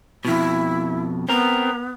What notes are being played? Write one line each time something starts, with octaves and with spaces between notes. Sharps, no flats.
F2 B2 E4
B3 C4 A#4